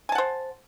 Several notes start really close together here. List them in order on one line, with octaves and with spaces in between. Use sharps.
G#5 A5 F#5 C5